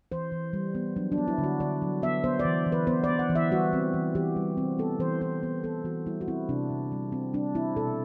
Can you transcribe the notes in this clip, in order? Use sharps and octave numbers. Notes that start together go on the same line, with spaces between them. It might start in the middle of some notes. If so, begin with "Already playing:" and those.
E3 C5
E3
G3
B3
F#3 D4
D4
B3
E4
D3
F#4
D3 D5
F#3
B3 E5
B3 C5
D5
E3
E3
B4
B3 C5
B3 D5
F#5
E3
E5
G3 F#4
C4
E3
E3 G4
G3
C4
B3 A4
E3 C5
E3 C5
B3
B3 A4
E3 F#4
G3 E4
F#4
C4 E4
C3 D4
C3
G3
C4
G3 D4
C4 E4
B2 A4